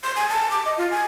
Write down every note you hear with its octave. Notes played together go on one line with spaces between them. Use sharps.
C6
G#5
A5
D6
D#5
F4
G#5